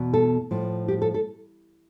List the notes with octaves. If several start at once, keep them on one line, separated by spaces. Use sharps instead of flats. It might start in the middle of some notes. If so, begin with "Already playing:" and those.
Already playing: E2 B2
A4
A2 F3
G4
A4
A4